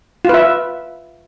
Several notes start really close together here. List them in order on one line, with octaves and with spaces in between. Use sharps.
F4 B4 E5